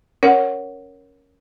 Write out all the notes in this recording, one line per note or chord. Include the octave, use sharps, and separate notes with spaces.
C#4 A#4 C#5 F#5